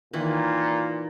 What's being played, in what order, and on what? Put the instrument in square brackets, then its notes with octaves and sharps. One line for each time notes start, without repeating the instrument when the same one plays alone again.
[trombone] A#2 [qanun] D#3 E3